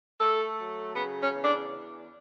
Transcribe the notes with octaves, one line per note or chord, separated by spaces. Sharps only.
A3 A4
F#3
C#3 B3
C#4
E2
D4